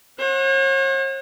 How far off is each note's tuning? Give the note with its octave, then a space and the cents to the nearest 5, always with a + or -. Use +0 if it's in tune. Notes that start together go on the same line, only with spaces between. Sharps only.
C#5 -45 F#5 -20